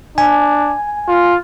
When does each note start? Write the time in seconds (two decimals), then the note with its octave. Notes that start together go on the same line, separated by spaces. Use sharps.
0.18 D4 G#5
1.08 F4